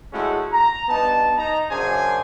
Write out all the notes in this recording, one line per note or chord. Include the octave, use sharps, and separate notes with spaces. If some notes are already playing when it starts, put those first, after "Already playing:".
A2 G#3 A3 C#4 E4 F#4
A#5
G2 B3 D#4 A5
D#4 A#5
F#2 C#3 D4 G#4 C5 G#5